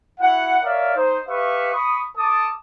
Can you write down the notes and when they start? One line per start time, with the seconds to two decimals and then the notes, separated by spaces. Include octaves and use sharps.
0.20 E4 F#4 F#5
0.64 A#4 C#5 D5 E5 F5
0.95 D#4 C5
1.28 G4 B4 E5 F5 C#6
1.73 B5 C#6 D#6
2.16 A4 A5 D6 D#6